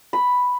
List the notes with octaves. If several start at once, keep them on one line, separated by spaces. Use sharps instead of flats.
B5